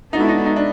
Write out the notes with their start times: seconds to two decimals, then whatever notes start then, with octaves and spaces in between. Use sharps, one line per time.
0.13 G#3 B3 D4 D#4 F#4 A4
0.21 E4
0.29 D#4
0.46 D#4
0.56 D4